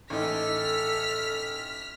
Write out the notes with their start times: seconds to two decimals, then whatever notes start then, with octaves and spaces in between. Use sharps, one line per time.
0.10 A1 D#4 A4 F6 B6